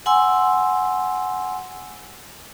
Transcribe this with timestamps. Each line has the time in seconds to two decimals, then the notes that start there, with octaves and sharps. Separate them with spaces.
0.06 F#5 G#5 C6 E6